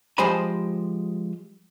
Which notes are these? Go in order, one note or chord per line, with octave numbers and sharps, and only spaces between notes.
F3 G#3 G4 C5 G#5 B5